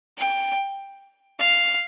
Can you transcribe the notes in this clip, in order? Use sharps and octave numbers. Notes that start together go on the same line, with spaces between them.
G5
F5